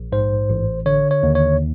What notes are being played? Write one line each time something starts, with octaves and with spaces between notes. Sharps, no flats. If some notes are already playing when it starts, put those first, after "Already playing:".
Already playing: A#1
G#2 C5
A1
D3 C#5
C#5
D#2
C#5